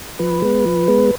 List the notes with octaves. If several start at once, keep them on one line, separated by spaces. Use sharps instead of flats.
F3 B4
G#3 B3
F3
G#3 B3